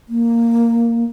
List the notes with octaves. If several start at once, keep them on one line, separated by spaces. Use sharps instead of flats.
A#3